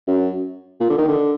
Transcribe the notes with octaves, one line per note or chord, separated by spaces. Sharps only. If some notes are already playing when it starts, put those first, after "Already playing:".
F#2
A#2
D3
D#3
D3